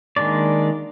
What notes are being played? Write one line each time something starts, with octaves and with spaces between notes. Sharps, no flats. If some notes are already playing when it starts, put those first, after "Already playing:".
D#3 G#3 A#3 D4 D5